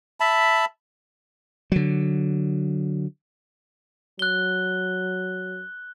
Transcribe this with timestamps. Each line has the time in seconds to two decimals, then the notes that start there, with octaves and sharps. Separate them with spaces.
0.20 E5 A5 B5
1.72 D3 F#3
4.19 F#3 F#6 G7